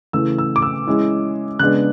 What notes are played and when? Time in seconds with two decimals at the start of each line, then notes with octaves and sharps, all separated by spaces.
0.13 C#3 E3 A3 E6
0.38 E6
0.56 D6
0.62 E6
0.87 E3 G#3 C#4 E4
1.59 C#3 G#3 B3 D4 F#6